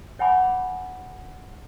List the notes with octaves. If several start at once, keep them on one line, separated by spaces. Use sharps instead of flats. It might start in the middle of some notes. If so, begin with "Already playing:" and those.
C#5 F#5 G#5 B5 D6